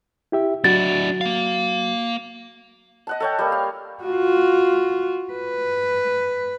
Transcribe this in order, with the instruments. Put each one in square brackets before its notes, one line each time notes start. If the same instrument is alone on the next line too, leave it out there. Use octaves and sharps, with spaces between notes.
[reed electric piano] E4 G4 E5
[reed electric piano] F#3 F#4 [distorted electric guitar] D4 E4 [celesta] A6
[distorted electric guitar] A#3 F5
[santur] D#5 F#5 A5
A4 C#5 G5
G3 A#3
F5
[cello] F4 F#4
B4